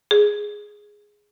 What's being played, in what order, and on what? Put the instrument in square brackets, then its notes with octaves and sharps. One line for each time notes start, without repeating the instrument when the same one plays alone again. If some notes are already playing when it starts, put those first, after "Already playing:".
[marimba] G#4